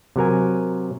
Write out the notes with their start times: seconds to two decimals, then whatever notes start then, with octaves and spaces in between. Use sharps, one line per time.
0.16 C3 F#3 A#4 G#5